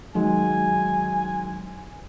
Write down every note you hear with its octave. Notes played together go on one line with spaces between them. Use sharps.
D#3 F#3 G#3 G#5